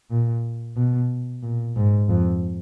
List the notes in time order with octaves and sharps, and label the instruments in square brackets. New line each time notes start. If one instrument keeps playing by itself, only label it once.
[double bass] A#2
B2
A#2
G#2
F2